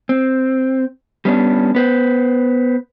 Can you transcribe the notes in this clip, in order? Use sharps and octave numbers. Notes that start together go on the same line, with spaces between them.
C4
G3 B3 C#4 D4
B3 B4 C5